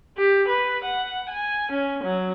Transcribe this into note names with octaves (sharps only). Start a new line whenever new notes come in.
G4
B4
F#5
G#5
C#4
F#3